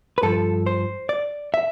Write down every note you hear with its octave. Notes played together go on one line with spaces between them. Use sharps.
B4
G2 F3 A4
C5
D5
E5